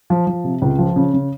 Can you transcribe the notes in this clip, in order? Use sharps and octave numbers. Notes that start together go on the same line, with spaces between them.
F3
F3
C3
C#2
F3
C#3
C#3